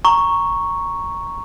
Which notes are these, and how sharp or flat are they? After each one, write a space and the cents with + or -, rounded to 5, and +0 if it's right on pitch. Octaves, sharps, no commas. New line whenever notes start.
A#5 +0 C#6 +0